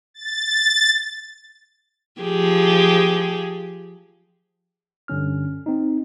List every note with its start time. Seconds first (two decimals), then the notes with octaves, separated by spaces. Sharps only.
0.14 A6
2.22 F3 G4 G#4
5.08 G2 D3 C#4 F6
5.66 C4 D#4